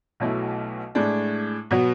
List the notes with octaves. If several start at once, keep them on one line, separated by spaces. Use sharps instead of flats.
B1 B2 F#3 A3 E4
A2 G#3 D4
B2 F#3 B3